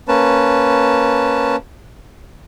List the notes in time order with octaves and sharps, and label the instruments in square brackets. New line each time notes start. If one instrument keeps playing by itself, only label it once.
[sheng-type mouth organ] A#3 C#4 B4 A5